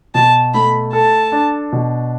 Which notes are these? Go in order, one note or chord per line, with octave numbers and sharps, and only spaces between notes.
B2 A5
A3 B5
A4 A5
D4
B2